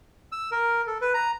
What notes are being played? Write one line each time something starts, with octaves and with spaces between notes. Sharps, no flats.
E6
A#4
A4
B4
A#5